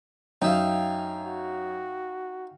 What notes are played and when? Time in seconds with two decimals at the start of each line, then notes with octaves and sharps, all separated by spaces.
0.42 F#2 D#4 E5 F5 G5
1.24 F#4